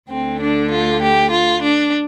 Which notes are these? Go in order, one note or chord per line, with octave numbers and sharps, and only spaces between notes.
D2 D3 C4
D4
F4
G4
F4
D4